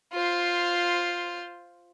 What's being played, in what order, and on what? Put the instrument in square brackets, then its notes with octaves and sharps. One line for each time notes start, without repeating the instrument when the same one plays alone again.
[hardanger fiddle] F4 C5